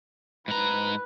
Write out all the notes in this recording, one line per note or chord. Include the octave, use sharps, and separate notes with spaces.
G#2 B4 A#5